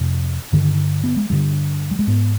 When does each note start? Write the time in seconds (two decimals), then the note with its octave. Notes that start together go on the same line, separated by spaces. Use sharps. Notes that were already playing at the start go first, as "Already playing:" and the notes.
Already playing: F2 C3
0.52 G2 D3 D#3
1.04 B3
1.17 G#3
1.30 G2 D3 G3
1.91 G3
1.99 G#3
2.07 G#2 B3